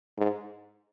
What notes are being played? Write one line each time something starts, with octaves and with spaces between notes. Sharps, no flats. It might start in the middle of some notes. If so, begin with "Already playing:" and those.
G#2